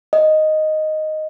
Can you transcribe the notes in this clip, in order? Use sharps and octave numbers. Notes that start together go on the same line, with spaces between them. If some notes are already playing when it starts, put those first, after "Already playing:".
D#5